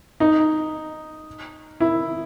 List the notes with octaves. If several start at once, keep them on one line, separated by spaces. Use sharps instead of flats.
D#4
E4